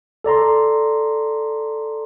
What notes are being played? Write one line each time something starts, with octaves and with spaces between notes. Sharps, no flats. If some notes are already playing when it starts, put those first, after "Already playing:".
A4 D5 A#5 C6